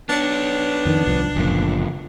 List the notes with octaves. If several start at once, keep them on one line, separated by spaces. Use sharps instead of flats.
B3 D4 C#5
F2 D#3
C2 F3
F#1 D2 A#2 F3